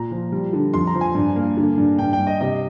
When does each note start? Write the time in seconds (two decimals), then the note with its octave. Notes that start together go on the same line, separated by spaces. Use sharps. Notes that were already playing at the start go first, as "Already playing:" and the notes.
Already playing: A#2 A#5
0.11 F3
0.32 G3
0.53 D3
0.74 F2 C6
0.87 A#5
0.94 F3
1.01 G#5
1.15 G2
1.36 A#3
1.57 D3
1.78 G2
1.99 G2 G5
2.13 G5
2.19 G2
2.27 D#5
2.41 C3 D#5